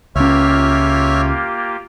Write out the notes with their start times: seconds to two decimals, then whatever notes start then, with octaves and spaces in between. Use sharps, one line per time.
0.16 C#2 A#3 C#4 F4 G4 C#5 E5 F6